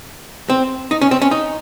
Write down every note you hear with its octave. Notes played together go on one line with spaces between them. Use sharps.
C4
D#4
C#4
C4
C#4
D#4